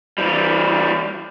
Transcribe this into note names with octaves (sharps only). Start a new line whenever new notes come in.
E3 G3